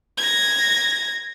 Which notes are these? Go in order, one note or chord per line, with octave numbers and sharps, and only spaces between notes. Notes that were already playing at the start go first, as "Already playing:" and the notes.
G#6 A#6